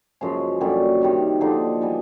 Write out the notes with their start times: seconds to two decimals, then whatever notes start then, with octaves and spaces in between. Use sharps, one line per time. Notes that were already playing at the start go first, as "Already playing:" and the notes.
0.21 F#2 C#3 F3 G#3
0.61 F#2 D3 G3 A#3
1.01 C3 D#3 G3
1.41 D3 F3 A#3 D#4
1.81 E3 G3 B3